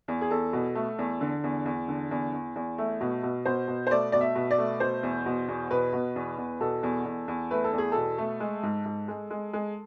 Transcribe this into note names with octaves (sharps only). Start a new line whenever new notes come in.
E2
G#4
E2 A4
B2
A3
E2
D3
E2
E2
D3
E2
E2
E2
A3
B2
B2
B2 C5
B2
C5
A3 D5
B2 D5
E5
B2
D5
A3
B2 C5
E2
B2
E2
B2 B4
B2
E2
E2
B2 A4
E2
E2
E2
A3 B4
A4
E2
G#4
B2 A4
A3
G#3
G#2
G#2
G#3
G#3
G#3